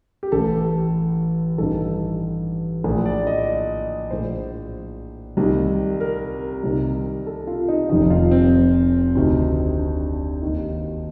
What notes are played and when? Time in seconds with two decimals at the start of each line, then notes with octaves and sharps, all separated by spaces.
0.23 G4
0.32 A1 A2 A4
1.58 A1 G2 D#3 A4
2.84 A#1 A2
3.06 D5
3.27 D#5
4.11 A#1 A2 C5
5.37 C2 C3 D#3
6.00 A#4
6.63 C2 C3 D#3
7.26 A4
7.47 F4
7.68 D#4
7.89 F1 F2 C3 D#3 D#4
8.10 F4
8.31 C4
9.15 D2 C3 D#3
9.79 D4
10.42 D#2 D#3